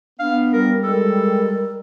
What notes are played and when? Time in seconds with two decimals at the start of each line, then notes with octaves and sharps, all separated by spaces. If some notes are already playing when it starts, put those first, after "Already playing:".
0.19 B3 D4 F5
0.53 G3 A#4
0.83 G#3 A4 A#4